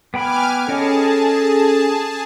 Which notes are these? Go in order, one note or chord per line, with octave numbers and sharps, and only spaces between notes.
B3 G5 G#5 B5 D6 F6
C#4 G#4 A4 C#5 D#5 A5